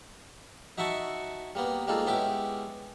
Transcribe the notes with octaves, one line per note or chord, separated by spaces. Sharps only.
D#4 F#4 E5 F#5 A5 C#6
G3 A#3 B3
G3 G#3 A#3 D#4 F4 A4
G#3 B3 C#4 E4 G4 D6